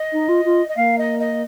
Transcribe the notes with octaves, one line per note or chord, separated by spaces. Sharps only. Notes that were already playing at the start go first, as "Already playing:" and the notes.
Already playing: D#5
D#4
F4
F4
D#5
A#3 F5
D#5
D#5